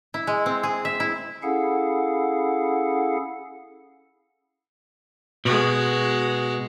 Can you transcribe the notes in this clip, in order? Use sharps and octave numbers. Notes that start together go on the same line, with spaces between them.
E4
G#3
C4
G#4
E5
E4
C#4 E4 G#4 A4 F5 F#5
B2 G#3 F#4